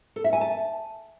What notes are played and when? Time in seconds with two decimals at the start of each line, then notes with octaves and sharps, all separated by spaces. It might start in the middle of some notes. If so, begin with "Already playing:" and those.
0.16 A4
0.24 E5
0.33 G#5
0.41 A5